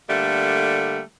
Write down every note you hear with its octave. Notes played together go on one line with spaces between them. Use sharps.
D3 G3 A3 A#3